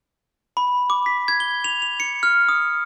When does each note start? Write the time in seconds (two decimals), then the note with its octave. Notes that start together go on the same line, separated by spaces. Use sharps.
0.57 B5
0.90 D6
1.06 B6
1.28 G#6
1.40 G7
1.64 F7
1.82 F7
2.00 C#7
2.23 F6
2.49 D#6